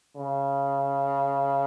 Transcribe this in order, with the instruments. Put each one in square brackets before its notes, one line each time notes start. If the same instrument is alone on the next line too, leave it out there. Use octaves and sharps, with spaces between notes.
[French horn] C#3